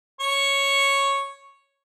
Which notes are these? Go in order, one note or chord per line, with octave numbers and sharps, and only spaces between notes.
C#5 C#6